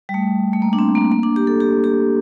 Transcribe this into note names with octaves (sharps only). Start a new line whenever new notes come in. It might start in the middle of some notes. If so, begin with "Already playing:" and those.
G3
A3
A3
A#3
D4
C4
A#3
A#3
D4
G4
A4
G4
G4